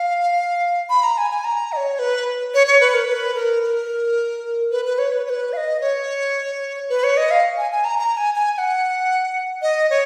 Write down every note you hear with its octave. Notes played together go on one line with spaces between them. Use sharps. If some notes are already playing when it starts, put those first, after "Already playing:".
Already playing: F5
B5
A#5
G#5
G#5
A#5
D#5
C#5
B4
C#5
C#5
B4
A#4
B4
A#4
A#4
B4
B4
C#5
B4
C#5
B4
F5
D#5
C#5
B4
C#5
D#5
F5
G#5
G#5
A#5
A#5
G#5
G#5
G#5
F#5
D#5
C#5